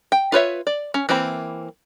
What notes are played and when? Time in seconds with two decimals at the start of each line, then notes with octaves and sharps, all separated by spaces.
0.12 G5
0.32 F4 B4 C#5 E5
0.67 D5
0.94 C#4
1.09 E3 A#3 C4 B5